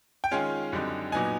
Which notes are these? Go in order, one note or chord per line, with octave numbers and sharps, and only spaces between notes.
G5
D#3 G#3 C#4 F4 G#5
F#2 D3 G3 C4 D#4
A#2 F#3 B3 D#4 G#5